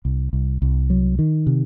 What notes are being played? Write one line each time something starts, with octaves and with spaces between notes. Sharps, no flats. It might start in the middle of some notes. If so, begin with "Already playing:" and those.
C2
C2
C2
F#3
D#3
C3